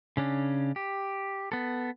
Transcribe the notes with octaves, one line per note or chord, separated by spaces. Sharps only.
C#3 C#4 D4
G4
B3 A4